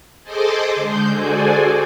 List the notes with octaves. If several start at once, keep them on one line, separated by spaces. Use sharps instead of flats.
G#4 A4 C5 D#5 C6 D6
D3 G#3 G6
F#4 G#4 A4 C5 D5 G#5